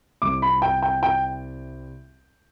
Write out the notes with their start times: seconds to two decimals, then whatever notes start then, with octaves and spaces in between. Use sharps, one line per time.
0.22 C2 C3 G3 C4 D6
0.42 B5
0.62 G5
0.82 G5
1.03 G5